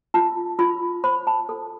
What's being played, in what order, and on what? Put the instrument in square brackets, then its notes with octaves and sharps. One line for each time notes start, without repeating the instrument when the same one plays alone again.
[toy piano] F4 A5
F4 B5
C5 B5
A5
A4